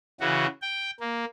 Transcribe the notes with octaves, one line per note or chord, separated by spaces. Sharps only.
C#3 E3 F#4
G5
A#3